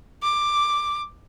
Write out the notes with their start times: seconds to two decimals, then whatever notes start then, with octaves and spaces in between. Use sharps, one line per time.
0.23 D6